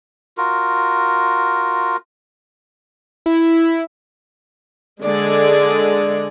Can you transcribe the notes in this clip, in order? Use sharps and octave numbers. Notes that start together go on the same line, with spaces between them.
F4 F#4 A#4
E4
D3 G#3 G#4 D5